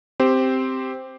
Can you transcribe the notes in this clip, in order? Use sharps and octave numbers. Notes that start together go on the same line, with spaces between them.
C4 G4 C5